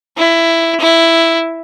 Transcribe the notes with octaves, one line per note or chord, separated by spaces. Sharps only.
E4
E4